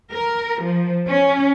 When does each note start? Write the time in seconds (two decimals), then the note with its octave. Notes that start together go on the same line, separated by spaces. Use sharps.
0.11 A#4
0.63 F3
1.06 C#4